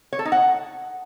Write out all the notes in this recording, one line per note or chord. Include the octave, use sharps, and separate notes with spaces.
C#5
A4
D#4
F#5